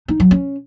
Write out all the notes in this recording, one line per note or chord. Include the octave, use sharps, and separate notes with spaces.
D#4
F#3
C#4